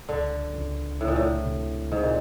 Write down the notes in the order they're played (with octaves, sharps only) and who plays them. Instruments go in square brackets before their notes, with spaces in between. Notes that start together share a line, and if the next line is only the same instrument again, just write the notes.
[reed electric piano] C#2 [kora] D3
[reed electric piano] C#2
[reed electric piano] C#2 [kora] A2
[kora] A#2
A2
[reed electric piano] C3
[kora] G#2 [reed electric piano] C3
[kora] A#2